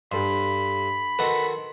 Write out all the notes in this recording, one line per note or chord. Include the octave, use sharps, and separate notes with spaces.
G2 G4 A4 B5 C6
D#3 F#4 A4 B4 C6